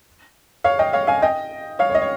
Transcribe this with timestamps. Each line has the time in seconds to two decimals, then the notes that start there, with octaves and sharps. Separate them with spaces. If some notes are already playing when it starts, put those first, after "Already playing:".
0.64 C#5 F5
0.79 D#5 G5
0.93 C#5 F5
1.07 F5 G#5
1.22 D#5 G5
1.79 C#5 F5
1.90 C#5
1.95 D#5
2.02 C#5